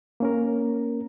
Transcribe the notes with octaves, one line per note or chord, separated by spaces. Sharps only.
A#3 C#4 A#4